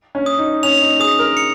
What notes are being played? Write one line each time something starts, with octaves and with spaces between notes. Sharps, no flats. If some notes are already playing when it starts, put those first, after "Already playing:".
C#4
D#6
D#4
C#4 F7
D#4
G#4 D#6
A#4
C#7